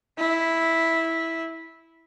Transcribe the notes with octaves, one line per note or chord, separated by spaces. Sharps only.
E4